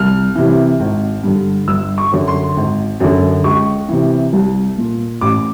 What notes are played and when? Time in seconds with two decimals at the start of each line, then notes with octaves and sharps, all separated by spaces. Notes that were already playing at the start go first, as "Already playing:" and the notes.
Already playing: C2 F6
0.35 C3 E3
0.80 G#1
1.23 G2 D3
1.68 G1 E6
1.98 C#6
2.12 F#2 D3
2.28 C6
2.57 G#1
3.00 F#2 D3
3.44 C#2 C#6
3.89 C3 E3
4.33 C2
4.78 A#2
5.21 A1 D6